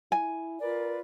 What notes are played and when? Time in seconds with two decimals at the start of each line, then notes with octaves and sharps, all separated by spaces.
0.12 E4 G#5
0.61 F4 A#4 B4 D5